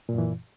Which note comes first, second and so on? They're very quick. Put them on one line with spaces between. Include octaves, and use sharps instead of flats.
A#2 F#2 E3